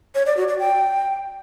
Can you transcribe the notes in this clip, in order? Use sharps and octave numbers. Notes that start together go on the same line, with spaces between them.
C#5
D5
F#4
D5
G5